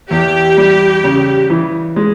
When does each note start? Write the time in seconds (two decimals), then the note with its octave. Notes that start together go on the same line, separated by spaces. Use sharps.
0.11 E2 G4
0.57 G3
1.04 C#3
1.50 E3
1.96 G#3